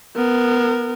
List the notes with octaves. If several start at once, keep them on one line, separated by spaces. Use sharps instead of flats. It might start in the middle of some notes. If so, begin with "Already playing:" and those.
B3 A#4